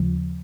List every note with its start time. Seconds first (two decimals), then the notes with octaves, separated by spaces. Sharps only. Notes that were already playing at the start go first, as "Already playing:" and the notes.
Already playing: D#2 C#3 F3